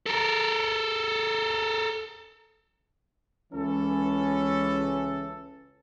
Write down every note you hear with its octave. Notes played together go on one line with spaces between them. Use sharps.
A4 A#4
C#2 E3 C#4 A4